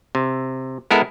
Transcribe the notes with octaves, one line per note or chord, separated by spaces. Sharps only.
C3
G#3 B3 E4 A4 A#4